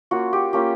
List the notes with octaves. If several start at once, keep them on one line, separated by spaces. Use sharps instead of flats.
A#3 C#4 F4 F#4
G4
A#3 C#4 F4 G4